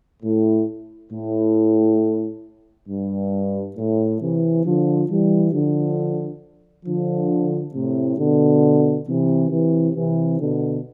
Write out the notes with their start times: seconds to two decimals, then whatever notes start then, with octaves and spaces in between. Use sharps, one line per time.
0.23 A2
1.11 A2
2.88 G2
3.77 A2
4.20 C3 E3
4.64 D3 F3
5.09 E3 G3
5.53 D3 F3
6.85 D3 F3
7.74 A2 C3
8.18 B2 D3
9.07 C3 E3
9.51 C3 E3
9.95 C3 E3
10.39 B2 D3